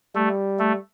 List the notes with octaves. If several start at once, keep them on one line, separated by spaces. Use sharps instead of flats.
G3 A3
A3